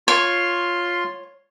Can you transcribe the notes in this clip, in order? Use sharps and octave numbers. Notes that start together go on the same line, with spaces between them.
F4 C#5 C6